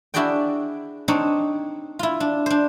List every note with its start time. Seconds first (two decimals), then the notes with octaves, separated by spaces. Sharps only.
0.14 D4 E4 F#4 G#4 D5 G5
1.08 C4 D4 D#4 C#5
1.99 E4 F4
2.20 D4
2.46 D4 C5